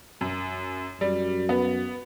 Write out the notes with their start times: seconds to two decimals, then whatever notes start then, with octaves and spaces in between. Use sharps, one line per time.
0.21 F#2
1.01 F#2 G3
1.49 B3